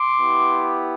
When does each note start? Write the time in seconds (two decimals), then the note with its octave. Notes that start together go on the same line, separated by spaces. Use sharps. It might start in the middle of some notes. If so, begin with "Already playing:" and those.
Already playing: C6 D6
0.18 B3 E4 G4